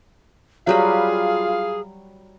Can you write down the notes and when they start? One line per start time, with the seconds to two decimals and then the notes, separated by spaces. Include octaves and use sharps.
0.67 F#3 G3 F4 G#4 B4 F5